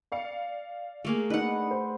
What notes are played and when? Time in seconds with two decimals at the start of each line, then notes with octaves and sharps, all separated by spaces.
0.12 D5 F5 C#7
1.05 A3 A#3 G#4
1.30 D4 D#4 B4 F#5
1.71 C5